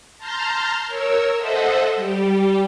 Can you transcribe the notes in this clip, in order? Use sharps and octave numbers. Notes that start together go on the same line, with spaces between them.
A5 A#5 C6 F6 G6
A#4 C#5 E6
A4 C5 D#5 E5 F#5
G3 G4